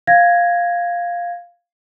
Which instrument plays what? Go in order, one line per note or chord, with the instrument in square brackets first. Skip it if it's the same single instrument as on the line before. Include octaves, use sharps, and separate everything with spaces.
[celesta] F5 G#6 A#6